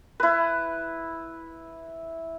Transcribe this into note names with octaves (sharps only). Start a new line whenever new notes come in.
E4 B4